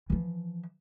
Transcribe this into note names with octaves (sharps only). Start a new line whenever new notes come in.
E3 F3